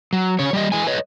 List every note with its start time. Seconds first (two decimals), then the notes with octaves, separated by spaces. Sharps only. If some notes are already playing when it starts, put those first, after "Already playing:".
0.13 F#3
0.39 C#3 C#5
0.53 G3 G4 D#5
0.72 E3 G#3 G#5
0.87 B4 C#5 D#5